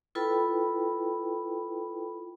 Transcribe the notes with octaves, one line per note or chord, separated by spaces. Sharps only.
E4 F4 A4 B4 G5 B5